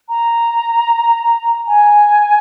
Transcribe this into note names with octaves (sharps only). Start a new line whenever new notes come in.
A#5
G#5